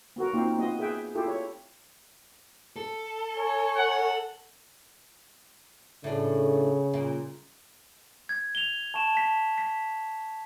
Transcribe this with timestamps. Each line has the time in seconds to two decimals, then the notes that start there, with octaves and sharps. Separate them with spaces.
0.16 B3 F#4 A#4
0.33 A#3 C4 D#4 F4
0.58 B3 F4 D#5
0.79 G#4 B4 E5 G5
1.15 E4 F4 G4 A4
1.28 C#5
2.76 A4
3.35 C#5 G#5
3.77 F#5
6.04 A2 C#3 D4
6.94 A#2
8.29 G#6
8.55 F7 G7
8.94 A5 C#6 E7
9.15 A5 B6
9.58 B6